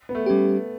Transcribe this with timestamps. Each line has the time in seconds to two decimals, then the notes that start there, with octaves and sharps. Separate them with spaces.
0.09 B3
0.15 A3
0.26 G3 C#4 G4